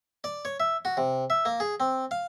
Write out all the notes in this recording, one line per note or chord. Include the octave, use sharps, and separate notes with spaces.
D5
C#5
E5
F#4
C3
E5
A#3
G#4
C4
F5